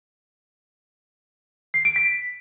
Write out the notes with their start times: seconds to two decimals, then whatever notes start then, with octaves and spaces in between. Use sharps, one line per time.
1.74 C7
1.85 D7
1.96 B6